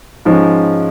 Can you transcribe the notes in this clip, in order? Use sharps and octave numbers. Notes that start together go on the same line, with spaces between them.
G#2 F3 G#3 C#4